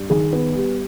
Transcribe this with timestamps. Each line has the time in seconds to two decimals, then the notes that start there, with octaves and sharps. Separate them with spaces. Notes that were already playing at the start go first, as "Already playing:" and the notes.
Already playing: G2
0.10 D#3 G#4
0.33 B3
0.55 G3